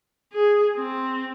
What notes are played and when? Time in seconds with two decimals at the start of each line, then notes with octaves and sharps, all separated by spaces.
0.33 G#4
0.77 C4